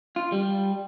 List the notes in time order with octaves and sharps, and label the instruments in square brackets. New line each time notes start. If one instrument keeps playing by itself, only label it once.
[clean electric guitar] F4
G3